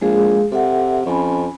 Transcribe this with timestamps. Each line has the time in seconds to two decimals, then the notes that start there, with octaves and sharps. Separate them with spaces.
0.02 A#1 G#3 G#4 F5
0.52 C3 A4 E5 F#5
1.06 F2 C#4 G#5 B5